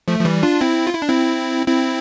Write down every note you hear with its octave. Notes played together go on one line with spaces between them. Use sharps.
F3 A3
F3
E3 G3
D4 F4
C4 E4
F4
E4
D4
C4 E4
C4 E4